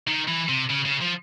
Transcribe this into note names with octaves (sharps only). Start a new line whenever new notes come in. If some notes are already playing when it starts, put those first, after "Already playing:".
D#3
E3
C3
C#3
C#3
F3